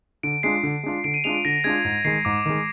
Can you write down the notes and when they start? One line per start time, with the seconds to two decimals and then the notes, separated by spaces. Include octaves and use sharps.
0.23 D3 D7
0.43 G#3 D4 F4 C7
0.63 D3
0.83 G#3 D4 F4
1.04 D3 D7
1.14 D#7
1.24 G#3 D4 F4 F7
1.35 D7
1.45 D3 A#6
1.64 G#3 D4 F4 G#6
1.85 G#2
2.05 D#3 G#3 C7
2.25 G#2 D6
2.46 D#3 G#3